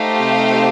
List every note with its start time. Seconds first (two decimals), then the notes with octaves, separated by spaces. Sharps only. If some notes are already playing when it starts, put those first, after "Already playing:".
Already playing: A3 D#4 G4 C5 F5
0.20 C3